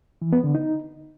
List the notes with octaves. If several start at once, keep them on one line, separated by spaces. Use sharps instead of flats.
E3
B3
D3
D#4